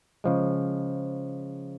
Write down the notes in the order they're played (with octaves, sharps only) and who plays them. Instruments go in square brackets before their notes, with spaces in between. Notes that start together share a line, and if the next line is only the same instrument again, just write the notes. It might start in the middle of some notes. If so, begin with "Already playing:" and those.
[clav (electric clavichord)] C#3 F3 G#3